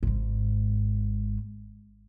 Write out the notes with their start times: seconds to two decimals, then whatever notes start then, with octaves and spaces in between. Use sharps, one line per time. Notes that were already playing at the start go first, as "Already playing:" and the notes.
0.03 G#1 G#2